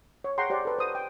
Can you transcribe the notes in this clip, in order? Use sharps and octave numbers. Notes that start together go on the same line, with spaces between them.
C#5
G#4 F#5 G5 A#5 C6
G4 C5 D5 F#5
A4 B4
C5 D#6
G5